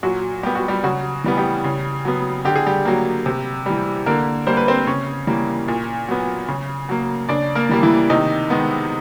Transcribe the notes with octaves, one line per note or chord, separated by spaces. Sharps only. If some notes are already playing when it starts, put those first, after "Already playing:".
A#2 F#3 F#4
G3 B3 G4
F#4
G3 G4
C#3 F#3 F#4
E3 G3 B3
G3 G4
C#3
F#3 B3
D3 G4
G#4
G3 G4
F#3 A#3
C3
E3 G3
D3 A#3 A#4
G3 A#3 C5
B4
C4 C5
C#3 C#4 C#5
E3 G3 A#3
A#2
F#3 B3
C#3
F#3 A#3
C#3 D4 D5
A#3 A#4
E3 G3 A#3
E3 E4
C3 D#3 D#4
D#3 G#3 B3